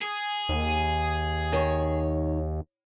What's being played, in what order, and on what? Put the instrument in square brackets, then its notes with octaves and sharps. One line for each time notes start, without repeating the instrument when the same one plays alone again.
[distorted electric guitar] G#4
[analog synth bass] D#2
[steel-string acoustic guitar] D#3 C#5